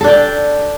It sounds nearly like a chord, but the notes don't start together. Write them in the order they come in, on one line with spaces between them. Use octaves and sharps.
A4 D4 G5